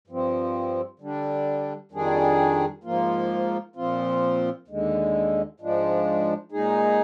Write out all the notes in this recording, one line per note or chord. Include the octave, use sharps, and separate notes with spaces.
G2 F3 C4
D3 G3 D4
F2 D#3 G3 D4 G#4
G#2 F3 A#3 F4
A#2 F3 C4 F4
D#2 D3 G#3
G#2 F3 G#3 D4
A#2 G#3 D#4 G#4